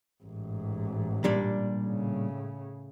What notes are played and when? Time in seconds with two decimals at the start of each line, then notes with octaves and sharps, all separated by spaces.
0.23 A1 G#2
1.24 A#2 G3 D4
1.84 A2 C#3